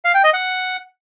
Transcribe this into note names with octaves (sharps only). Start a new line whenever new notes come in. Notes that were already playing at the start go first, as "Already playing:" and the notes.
F5
G5
D#5
F#5